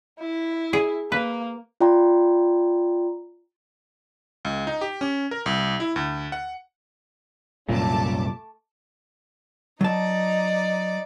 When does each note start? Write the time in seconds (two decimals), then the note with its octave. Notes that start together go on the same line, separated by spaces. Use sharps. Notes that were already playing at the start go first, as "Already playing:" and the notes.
0.19 E4
0.73 G#4
1.12 A#3 B4
1.81 F4 D5 G5 A#5 C6
4.45 C#2
4.67 D#4
4.81 G4
5.01 C#4
5.31 A#4
5.46 C2
5.80 E4
5.96 D2
6.32 F#5
7.69 C2 F#2 A#2 A3 A5 D6
9.81 F#3 D#4 D5 A5